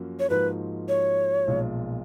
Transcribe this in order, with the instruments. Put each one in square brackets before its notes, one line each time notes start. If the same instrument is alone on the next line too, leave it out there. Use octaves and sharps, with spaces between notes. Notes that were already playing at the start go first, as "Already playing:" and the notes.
Already playing: [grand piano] F#2 F3 A#3 C#4 F#4
[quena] C#5
[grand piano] G#2 F3 A#3 D#4 F#4 [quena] B4
[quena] C#5
[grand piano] B1 A#2 F3 G#3